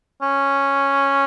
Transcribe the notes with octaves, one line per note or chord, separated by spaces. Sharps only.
C#4